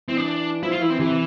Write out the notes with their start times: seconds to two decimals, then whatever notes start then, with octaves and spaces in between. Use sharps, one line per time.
0.08 E3 C4
0.17 D4
0.62 F3 E4
0.72 F4
0.80 E3 E4
0.90 C4
0.99 C3 E3